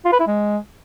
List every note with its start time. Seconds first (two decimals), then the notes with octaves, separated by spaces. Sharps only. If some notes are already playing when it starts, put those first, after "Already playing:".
0.05 F4
0.13 B4
0.20 E4
0.27 G#3